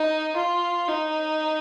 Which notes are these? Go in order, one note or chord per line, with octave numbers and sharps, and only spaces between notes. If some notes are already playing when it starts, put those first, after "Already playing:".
Already playing: D#4
F4
D#4